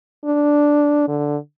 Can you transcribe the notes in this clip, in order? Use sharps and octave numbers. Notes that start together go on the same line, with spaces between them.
D4
D3